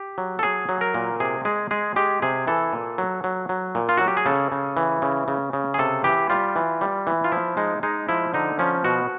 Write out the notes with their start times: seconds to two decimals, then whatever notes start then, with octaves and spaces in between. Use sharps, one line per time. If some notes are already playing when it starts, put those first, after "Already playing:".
Already playing: G4
0.18 F#3
0.39 A4
0.43 F#3 G#4
0.69 F#3
0.81 A#4
0.95 A#2
1.20 C3 G#4
1.45 G#3 G#4
1.71 G#3 G#4
1.96 G#3 G4
2.22 C3 G#4
2.47 E3 A4
2.73 A#2
2.98 F#3
3.24 F#3
3.49 F#3
3.75 A#2
3.89 F4
3.97 F#3 F#4
4.08 G4
4.17 G#4
4.26 C#3 A4
4.52 C#3
4.77 E3
5.02 C#3
5.28 C#3
5.53 C#3
5.74 G#4
5.79 C3 A4
6.04 E3 G4
6.30 G3 F4
6.56 E3
6.81 G3
7.07 E3
7.24 F4
7.32 F3 E4
7.57 G#3 D#4
7.83 G#3 D#4
8.09 F3 E4
8.34 D3 D#4
8.59 F3 C#4
8.84 B2 F#4